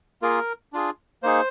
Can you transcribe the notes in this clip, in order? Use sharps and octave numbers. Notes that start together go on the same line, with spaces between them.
A#3 F4 G#4 A#4
D4 F4 G#4
A#3 D#4 G#4 C5